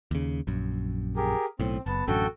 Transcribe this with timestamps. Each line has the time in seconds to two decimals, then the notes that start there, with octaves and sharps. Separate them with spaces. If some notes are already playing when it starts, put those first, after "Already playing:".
0.11 D#2 C#3
0.47 A#1 F#2
1.16 G4 G#4 A#4
1.60 B1 A2 C4
1.86 F#1 B3 A5
2.08 A1 F#2 D3 F#4 A4 G5